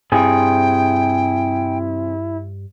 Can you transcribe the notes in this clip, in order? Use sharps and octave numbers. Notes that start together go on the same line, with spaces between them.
G2 C3 E4 G#4 G5